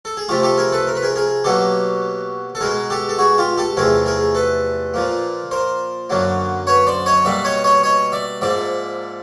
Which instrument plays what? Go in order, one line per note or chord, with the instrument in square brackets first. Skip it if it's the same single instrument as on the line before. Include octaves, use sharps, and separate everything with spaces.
[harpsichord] A4
G#4
C3 F3 A3 F4 G4
G4 A4
G#4 A#4
A4 B4
A#4
B4
G#4 A#4
G#4 A#4
B2 F#3 A#3 G4 A4
A4
B2 G#3 G#4 A#4
G4 A4
A4
F#4 G#4
F4 G4
G4 A4
E2 C3 F3 A3 G#4 A#4
G#4 A#4
A4 B4
A#2 F3 A#3
A#4 C5
F#2 D3 F#3 A#3
B4 C#5
C5 D5
C#5 D#5
B2 G3 A#3 D5 E5
C#5 D#5
C#5 D#5
C#5 D#5
D5 E5
G#2 F3 A#3 D5 E5